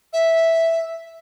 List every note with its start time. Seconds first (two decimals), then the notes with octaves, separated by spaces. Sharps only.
0.13 E5